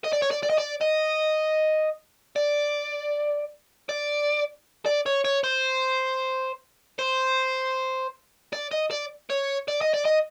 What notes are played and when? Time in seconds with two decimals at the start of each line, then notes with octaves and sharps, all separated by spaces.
0.04 D#5
0.12 D5
0.22 C#5
0.31 D5
0.43 D5
0.50 D#5
0.58 D5
0.81 D#5
2.36 D5
3.89 D5
4.86 D5
5.06 C#5
5.25 C#5
5.44 C5
6.99 C5
8.53 D5
8.71 D#5
8.91 D5
9.30 C#5
9.68 D5
9.81 D#5
9.94 D5
10.05 D#5